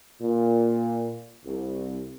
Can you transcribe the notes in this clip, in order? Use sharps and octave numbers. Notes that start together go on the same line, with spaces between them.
A#2
C2